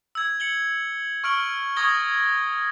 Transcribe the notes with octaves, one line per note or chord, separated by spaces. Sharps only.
E6 G#6
C#7 F#7 G7
C#6 F6 D7 F#7
C#6 D#6 G#6 A#6 G7